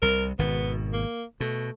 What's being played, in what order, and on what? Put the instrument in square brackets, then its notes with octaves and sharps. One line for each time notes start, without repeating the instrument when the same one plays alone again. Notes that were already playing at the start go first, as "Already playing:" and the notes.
[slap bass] C2 C3 [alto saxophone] A#4
[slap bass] G#1 B2 D#3 [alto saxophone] B3
[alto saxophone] A#3
[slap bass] B2 [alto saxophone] A3